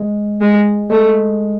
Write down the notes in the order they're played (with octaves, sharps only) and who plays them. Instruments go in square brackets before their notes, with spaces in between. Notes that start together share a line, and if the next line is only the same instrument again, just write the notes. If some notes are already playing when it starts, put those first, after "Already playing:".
Already playing: [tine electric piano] G#3
[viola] G#3
[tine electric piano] G#3 [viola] A3